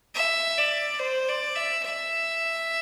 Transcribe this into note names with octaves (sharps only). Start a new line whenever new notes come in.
E5
D5
C5
D5
E5
E5